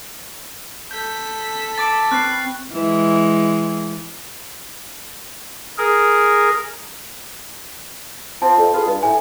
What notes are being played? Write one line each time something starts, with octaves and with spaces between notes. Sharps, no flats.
A4 G6 B6
A5 D6 A6 D7
C4 B4 F#6 C7
E3 G#3
G#4 A#4
F3 C4 A5
F2
F4 G#4 B4
G2
A2 G#5